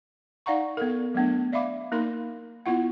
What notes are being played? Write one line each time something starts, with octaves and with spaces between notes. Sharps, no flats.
D#4 D5 F5 F#5 A#5 C#6
B3 A4 A#4
F#3 A3 B3 D4
D5 E5 F5 B5 D6
A#3 D#4 A#4 B5 C6
B3 E4 F4 F#5